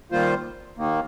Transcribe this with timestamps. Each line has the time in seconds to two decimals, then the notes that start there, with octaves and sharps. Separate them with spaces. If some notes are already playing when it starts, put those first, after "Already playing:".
0.12 D#3 G3 A#3 F4 C5
0.77 D#2 D#3 A#3